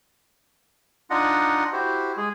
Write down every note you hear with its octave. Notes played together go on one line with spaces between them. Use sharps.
D4 D#4 F4 D#5 F#5
E4 F#4 G4 C5
G#3 G#4